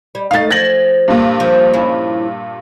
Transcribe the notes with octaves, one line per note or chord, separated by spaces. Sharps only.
G3
A3 D#4 F5 A6
F3 G#6 A#6 F#7
G2 A#2
F3
C#4 E4